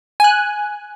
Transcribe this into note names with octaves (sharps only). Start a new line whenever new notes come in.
G#5 F#6